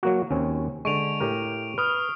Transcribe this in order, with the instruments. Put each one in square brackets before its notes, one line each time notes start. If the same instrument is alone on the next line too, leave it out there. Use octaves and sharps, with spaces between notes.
[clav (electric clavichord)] F#3 A#3 F#4
D#2 C4 C#4
[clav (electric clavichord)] D3 G#3 [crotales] C#6 D7 F7
[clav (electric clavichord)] A2 G4 A#4
[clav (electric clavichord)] B4 [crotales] D#6 F6